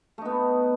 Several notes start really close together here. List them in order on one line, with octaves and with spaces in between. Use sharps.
A3 D#4 B3